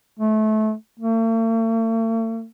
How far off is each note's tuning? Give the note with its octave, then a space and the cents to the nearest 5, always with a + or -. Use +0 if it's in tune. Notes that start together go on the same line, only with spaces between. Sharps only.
A3 -25
A3 +45